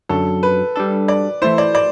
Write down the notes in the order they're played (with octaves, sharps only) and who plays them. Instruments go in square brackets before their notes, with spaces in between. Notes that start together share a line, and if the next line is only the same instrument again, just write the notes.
[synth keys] F#2 D3 F#3 [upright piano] A4
[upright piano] B4
[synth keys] G3 D4 A4
[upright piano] D5
[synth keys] E3 A3 E4 [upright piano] C5
[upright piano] D5
D5